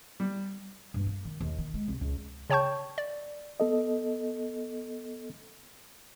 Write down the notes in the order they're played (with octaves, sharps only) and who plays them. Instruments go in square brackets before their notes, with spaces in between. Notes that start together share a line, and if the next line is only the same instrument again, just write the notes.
[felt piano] G3
[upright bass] G2
A#3
D#3
D#2
D#3
G#3
C2
C#2
[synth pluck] C#3 C#5 G5 A5 C#6 G6
D5
[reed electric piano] B3 A4 D#5